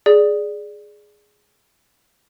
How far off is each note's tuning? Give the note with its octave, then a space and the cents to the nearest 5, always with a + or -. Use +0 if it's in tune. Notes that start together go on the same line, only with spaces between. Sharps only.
G#4 +5 D5 +0